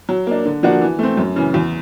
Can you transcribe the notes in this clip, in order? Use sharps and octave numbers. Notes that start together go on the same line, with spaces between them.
F#3
A#3 D4
D3
F3 A#3 D4 F#4
E3
A3 C4
F#2
C#3 E3
E2